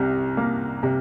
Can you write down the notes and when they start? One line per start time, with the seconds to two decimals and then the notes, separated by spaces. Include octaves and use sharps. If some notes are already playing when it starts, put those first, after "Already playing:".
Already playing: C2 C3
0.37 A#3
0.83 C3